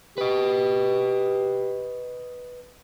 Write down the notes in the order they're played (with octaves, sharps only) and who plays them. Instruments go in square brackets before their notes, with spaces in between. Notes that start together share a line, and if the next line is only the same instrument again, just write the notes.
[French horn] G4 [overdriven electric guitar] B4 D#5